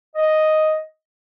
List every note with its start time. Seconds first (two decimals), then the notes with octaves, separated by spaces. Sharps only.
0.16 D#5